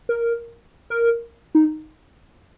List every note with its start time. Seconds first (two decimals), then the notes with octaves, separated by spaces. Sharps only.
0.09 A#4
0.90 A#4
1.55 D#4